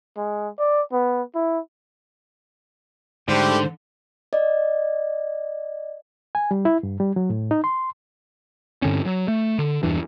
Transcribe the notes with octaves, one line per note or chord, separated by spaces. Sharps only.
G#3
D5
B3
E4
G#2 D3 G3 A3 G4 C5
D5 D#5
G#5
G3
E4
G2
G3
F#3
A2
D#4
C6
G2 D3 C4 C#4
F#3
A3
D3
E2 G2 E3 D4